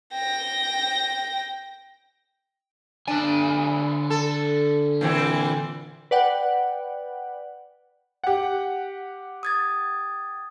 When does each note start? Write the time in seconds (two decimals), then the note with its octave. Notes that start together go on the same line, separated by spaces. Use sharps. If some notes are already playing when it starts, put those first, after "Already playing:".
0.14 G5 A#6
3.08 D3 D4 G#5
4.10 A4
5.01 A#2 E3 C4
6.11 B4 D5 F#5 G5
8.24 G4 F#5
9.43 D#6 G#6 A6